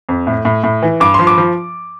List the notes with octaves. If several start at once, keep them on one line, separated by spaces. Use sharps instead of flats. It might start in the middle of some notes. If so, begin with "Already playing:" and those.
F2
A2
A2
A2
E3
G2 D6
F3 C6
D6
F3